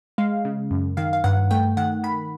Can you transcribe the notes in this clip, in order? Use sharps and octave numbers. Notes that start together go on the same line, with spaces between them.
G#3 F5
C#3
F#2
D#3 F5
F5
G2 F#5
A3 G5
D#3 F#5
D#3 B5